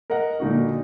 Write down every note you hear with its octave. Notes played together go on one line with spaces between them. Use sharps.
A#4 D#5 F#5
A#2 D3 D#4 F#4